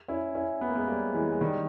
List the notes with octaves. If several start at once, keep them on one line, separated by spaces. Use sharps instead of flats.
C#4 E4
C#4 E4
B3
A#3
G#3 B3
G3 A#3
E3 G#3
G#3
D#3 G3